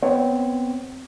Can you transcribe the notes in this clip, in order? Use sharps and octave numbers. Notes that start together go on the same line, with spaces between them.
B3 C4 C#5